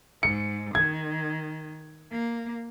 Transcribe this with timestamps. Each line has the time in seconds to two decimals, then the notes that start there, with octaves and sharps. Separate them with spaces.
0.23 G#2 C#7
0.75 D#3 G#6
2.12 A#3